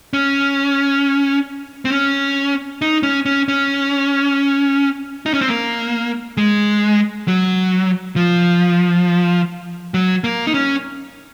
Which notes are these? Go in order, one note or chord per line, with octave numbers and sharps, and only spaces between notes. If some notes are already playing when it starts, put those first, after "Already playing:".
C#4
C4
C#4
D#4
C#4
C#4
C#4
D#4
C#4
C4
A#3
G#3
F#3
F3
F#3
A#3
D#4
C#4